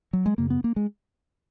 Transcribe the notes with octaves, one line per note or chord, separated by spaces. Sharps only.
F#3
G#3
F#2 C#3 A#3
B3
A#3
G#3